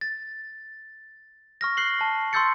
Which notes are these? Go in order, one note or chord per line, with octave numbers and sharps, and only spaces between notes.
A6
C#6 F6 A#6
F#6 C7 F#7 G7
A5 C#6
C6 C#6 E6 G6 A6 C#7